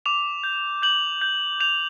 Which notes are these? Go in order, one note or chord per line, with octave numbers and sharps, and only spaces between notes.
D6 F7
G6
G6 F#7
G6
G6 F7